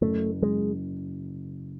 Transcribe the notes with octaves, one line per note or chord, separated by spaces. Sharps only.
F#1 A3
F#1 G#3